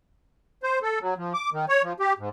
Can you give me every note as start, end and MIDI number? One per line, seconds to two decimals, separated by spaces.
0.63 0.79 72
0.82 0.99 69
1.01 1.14 54
1.17 1.33 53
1.34 1.50 86
1.53 1.66 51
1.69 1.82 73
1.83 1.93 53
2.00 2.13 67
2.19 2.29 44